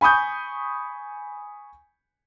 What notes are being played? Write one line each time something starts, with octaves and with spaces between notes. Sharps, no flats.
G#5 B5 C#6 D#6 G6